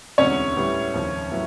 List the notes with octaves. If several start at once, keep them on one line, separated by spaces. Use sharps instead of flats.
E1 D2 C3 E3 G#3 C#4 C#5
A2 E3 G3 B3
F1 D#2 C#3 F3
A2 F#3 B3 E4